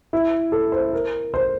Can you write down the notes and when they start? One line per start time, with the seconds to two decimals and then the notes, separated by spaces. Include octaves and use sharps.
0.13 E4
0.52 A4
0.72 C5
0.93 A#4
1.34 C5